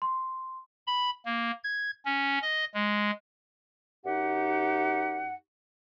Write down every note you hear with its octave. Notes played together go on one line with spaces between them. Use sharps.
C6
B5
A#3
G#6
C#4
D#5
G#3
F#2 D#4 G4 F#5